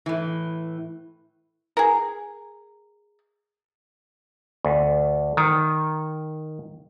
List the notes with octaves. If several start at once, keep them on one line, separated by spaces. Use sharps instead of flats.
A2 E3
G#4 A#4
D2
D#3